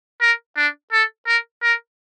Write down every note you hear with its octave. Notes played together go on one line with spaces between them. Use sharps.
A#4
D4
A4
A#4
A#4